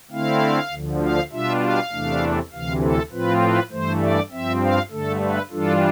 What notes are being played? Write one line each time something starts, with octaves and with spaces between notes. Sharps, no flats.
D3 A3 C4 E4 F5
D2 D3 F3
F5
B2 G3 D4 F4 E5
F5
E2 C3 E3 A3 D4
D2 C3 E3 F5
A4
A2 F3 C4 F4 B4
B4
G2 E3 A3 C5
D5
G2 F3 C4 E5
F5
G2 D3 A3 A4
B4
G2 E3 G3 D4 F4 A4